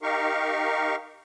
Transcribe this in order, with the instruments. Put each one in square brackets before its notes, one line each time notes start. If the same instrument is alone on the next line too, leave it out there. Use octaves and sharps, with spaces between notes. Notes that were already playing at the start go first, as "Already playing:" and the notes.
[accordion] D#4 G4 A#4 F5 C#6